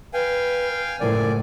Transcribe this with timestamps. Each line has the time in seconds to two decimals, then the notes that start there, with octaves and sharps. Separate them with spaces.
0.14 B4 F5 G5 G#5
1.00 F#1 A2 F3 A#4 D5 G#5